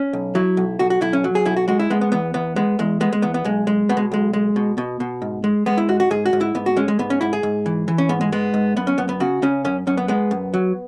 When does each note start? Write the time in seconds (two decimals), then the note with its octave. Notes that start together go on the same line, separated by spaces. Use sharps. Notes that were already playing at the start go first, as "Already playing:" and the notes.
Already playing: C#4
0.13 B1
0.35 F#3 E4
0.57 B1
0.79 B1 F#4
0.90 F#4
1.01 B1 E4
1.13 C#4
1.24 F#3
1.35 G#4
1.45 B1 E4
1.57 F#4
1.68 G#3 F#4
1.79 E4
1.90 G#3 B3
2.01 B3
2.12 E2 B3
2.34 E2 B3
2.56 G#3 B3
2.79 E2 G#3
3.01 G#3 B3
3.13 G#3
3.22 E2 B3
3.34 B3
3.44 B1 G#3
3.67 G#3
3.89 B2 B3
3.97 G#3
4.12 B1 G#3
4.33 G#3
4.56 B2
4.78 B2
5.00 B2
5.22 G#2
5.44 G#3
5.66 G#3 B3
5.78 E4
5.89 G#2 F#4
6.00 F#4
6.11 G#2 G#4
6.26 F#4
6.33 G#2
6.41 E4
6.55 G#2 B3
6.66 F#4
6.77 G#3 C#4
6.88 G#3
6.99 G#2 B3
7.10 C#4
7.21 G#2 E4
7.33 G#4
7.43 G#2
7.66 E3
7.88 E3
7.98 C#4
8.09 G#2 B3
8.21 G#3
8.32 G#3 B3
8.54 G#2
8.76 F#2 B3
8.87 C#4
8.98 F#2 B3
9.09 B3
9.20 C#3 F#4
9.42 C#3 C#4
9.65 F#2 C#4
9.87 F#2 C#4
9.97 B3
10.08 G#3 B3
10.31 F#2
10.54 F#3